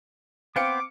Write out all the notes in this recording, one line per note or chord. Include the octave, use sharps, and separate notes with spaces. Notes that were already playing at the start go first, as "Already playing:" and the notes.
B3 C4 C5 F5 G5 D6 C#7